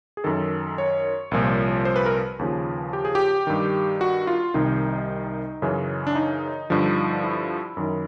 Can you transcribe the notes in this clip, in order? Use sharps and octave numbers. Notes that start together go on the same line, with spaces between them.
G#4
F#2 D#3 A4
C#5
C2 A#2 F3
C5
B4
A#4
B4
D#2 C#3 F3
G4
G#4
G4
G2 D#3
F#4
F4
C2 C3 D#3 D#4
F#2 C#3 E3
D4
D#4
G2 D3 F3
E4
F#2 D#3